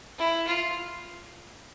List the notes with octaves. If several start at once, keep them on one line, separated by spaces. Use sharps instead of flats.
E4
F4